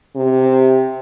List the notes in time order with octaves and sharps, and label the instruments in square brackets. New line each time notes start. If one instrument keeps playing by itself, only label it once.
[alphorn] C3